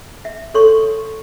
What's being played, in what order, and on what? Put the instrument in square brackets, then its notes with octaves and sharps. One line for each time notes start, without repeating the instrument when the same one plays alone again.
[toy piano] E5
A4 C#5 C6 C#6